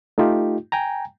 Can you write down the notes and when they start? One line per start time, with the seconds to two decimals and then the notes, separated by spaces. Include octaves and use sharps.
0.18 A3 D#4 F4 G4
0.72 G5 G#5 A#5